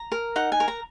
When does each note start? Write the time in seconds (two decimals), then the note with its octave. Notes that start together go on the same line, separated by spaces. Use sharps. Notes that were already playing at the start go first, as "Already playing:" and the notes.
Already playing: A#5
0.12 A#4
0.36 D#4 F#5
0.52 G#5
0.60 A#4
0.68 A#5